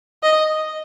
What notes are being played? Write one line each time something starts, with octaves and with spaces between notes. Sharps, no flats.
D#5